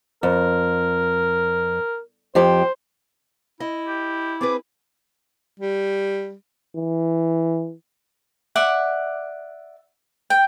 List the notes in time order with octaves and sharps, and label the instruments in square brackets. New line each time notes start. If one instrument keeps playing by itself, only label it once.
[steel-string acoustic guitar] F2 [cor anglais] A#4
[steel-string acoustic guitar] F2 F3 G4 [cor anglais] C5
[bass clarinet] E4 [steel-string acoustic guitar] D#5
[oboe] G4
[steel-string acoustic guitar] C4 G#4 B4 [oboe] D6
[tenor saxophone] G3
[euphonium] E3
[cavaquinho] D5 E5 F#5
G5